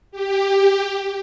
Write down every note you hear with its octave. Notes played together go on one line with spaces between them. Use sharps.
G4